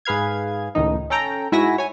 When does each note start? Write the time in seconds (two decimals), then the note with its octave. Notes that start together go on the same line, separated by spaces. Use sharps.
0.05 G#2 G#4 B4 F5 G#6
0.75 C#2 A2 D#3 D#4
1.10 C#4 A4 G5 A#5
1.52 G#2 E4 F#4 E5 G#5 A#6
1.78 C#5 G#5